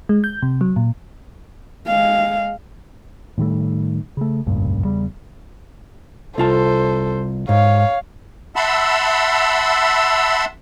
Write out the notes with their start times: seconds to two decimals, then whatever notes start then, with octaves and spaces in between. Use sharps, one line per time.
0.09 G#3
0.24 G6
0.42 C3
0.61 F#3
0.76 A#2
1.87 G#3 F5
3.38 A2 D#3 G3 A3
4.17 C#3 A3
4.46 F1 C#2 G2 A#2
4.84 E2 C#3 G3
6.38 C2 F4 A4 C5 A5
7.49 G#2 C#5 F5
8.56 E5 F#5 A5 B5 C6 E6